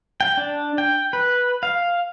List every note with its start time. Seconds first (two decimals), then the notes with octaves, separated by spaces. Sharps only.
0.21 G5
0.37 D4
0.78 G5
1.13 B4
1.63 F5